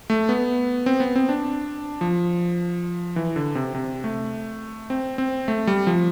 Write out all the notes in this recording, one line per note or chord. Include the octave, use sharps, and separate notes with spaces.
A3
B3
C4
B3
C4
D4
F3
E3
D3
C3
C3
A3
C4
C4
A3
G3
F3